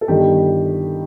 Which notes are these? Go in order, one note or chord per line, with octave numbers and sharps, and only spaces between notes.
A4
G1 G2 D#3 G4